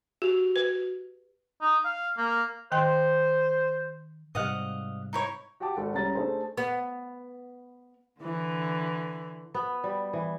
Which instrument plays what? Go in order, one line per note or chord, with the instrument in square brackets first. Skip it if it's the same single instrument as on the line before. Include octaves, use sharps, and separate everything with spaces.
[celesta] F#4 F7 [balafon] G4
[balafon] B4
[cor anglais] D#4
F5
A#3
[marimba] D#3 G5 C6 [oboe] C5
[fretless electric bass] G#2 C3 G3 [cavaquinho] D#5 F5 F#5
[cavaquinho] D#4 E4 C#5
[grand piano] F#4 G4 F#5 G5 A5 D6
G#1 A4 F#5
C2 C#3 C#4 A#5 A6
A3 D4 G#4 A4 C5
[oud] B3
[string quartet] D3 E3
[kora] B3
G3
E3